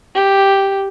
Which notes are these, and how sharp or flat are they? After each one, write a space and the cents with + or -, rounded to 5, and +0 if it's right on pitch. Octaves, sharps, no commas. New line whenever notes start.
G4 +0